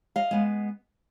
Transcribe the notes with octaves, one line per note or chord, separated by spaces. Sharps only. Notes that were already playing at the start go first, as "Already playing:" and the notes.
D#5 F5
G#3 B3